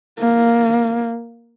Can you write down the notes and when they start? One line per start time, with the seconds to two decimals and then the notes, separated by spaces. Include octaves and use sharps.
0.19 A#3